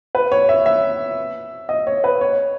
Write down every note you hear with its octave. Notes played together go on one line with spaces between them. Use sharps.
B4
C#5
E5
E5
D#5
C#5
B4
C#5